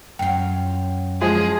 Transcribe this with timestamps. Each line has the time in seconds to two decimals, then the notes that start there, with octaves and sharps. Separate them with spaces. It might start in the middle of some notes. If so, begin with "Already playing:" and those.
0.19 F#2 F4 G5
1.21 F3 G#3 G#4